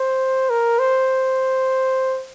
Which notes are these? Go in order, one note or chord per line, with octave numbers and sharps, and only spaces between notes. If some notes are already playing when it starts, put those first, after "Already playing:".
Already playing: C5
A#4
C5